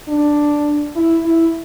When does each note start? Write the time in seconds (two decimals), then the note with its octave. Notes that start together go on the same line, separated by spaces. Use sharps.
0.08 D4
0.96 E4
1.26 E4